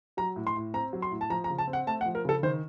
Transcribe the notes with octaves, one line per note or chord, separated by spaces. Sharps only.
F#3 A#5
A2
C6
A2
C4 A#5
F#3
C6
A2
A5
F3 A#5
A#5
C#3
A5
C4
F#5
A3 A5
F#5
F3
A#4
C#3 A4
D#3 C5